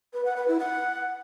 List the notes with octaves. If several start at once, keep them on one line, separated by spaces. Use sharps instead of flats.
B4
F#5
B4
E4
F#5